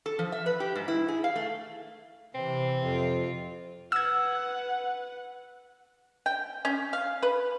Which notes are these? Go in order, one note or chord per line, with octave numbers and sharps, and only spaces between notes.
A4
F3
E5
B4
G4
G#2
E4
G#4
F5
A3
C3 E3 C4
F2 F4
B4 F#5 E6 G#6
G5
C#4
F5
B4